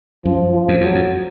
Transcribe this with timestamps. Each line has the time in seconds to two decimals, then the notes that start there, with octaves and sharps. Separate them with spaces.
0.25 F#2 F3
0.54 F3
0.68 F2
0.81 E2 F#3
0.95 F2